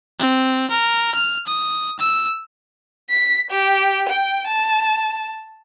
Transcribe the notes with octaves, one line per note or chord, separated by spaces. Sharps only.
C4
A#4
F6
D#6
E6
B6
G4
G5
A5